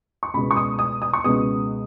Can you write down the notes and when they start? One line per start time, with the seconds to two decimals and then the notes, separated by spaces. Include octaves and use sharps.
0.23 C#6
0.34 C#2 B2 G#3 B3 B5
0.51 C#6
0.56 D#6
0.79 D#6
1.02 D#6
1.13 C#6
1.24 C#2 B2 G#3 B3 D#6